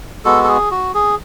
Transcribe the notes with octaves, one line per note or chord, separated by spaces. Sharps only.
G#3 B3 F#4 A4
A4
G#4
F#4
G#4